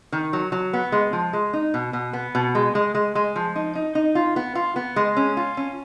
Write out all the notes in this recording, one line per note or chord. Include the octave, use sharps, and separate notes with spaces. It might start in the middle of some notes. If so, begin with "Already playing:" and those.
D#3
F#3
F#3
B3
G#3
F3
G#3
D#4
B2
B2
B3
B2
G#3
G#3
G#3
G#3
F3
D#4
D#4
D#4
F4
B3
F4
B3
G#3
C#4
F4
C#4